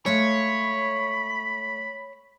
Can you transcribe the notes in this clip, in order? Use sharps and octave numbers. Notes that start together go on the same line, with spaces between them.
G#3 A3 C#5 F5 B5